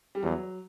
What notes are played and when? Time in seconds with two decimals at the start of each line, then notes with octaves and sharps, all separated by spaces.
0.15 G3
0.23 E2 F#3